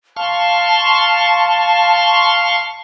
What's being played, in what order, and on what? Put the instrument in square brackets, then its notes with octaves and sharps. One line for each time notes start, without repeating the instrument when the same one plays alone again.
[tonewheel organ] F5 C6 C#6 [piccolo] A5